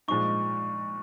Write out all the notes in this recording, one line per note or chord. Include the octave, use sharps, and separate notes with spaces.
A#2 F3 G#3 D#4 C#6